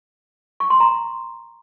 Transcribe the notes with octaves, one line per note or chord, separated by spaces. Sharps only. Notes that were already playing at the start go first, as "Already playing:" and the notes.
C#6
C6
A#5